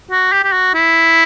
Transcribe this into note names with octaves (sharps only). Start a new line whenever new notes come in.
F#4
G4
G4
F#4
E4